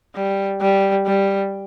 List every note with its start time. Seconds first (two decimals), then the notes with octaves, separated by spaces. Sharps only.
0.15 G3
0.61 G3
1.07 G3